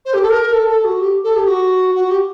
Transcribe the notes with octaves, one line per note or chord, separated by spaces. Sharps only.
C5
G4
A4
A#4
A4
A4
F#4
G4
A4
G4
F#4
F#4
G4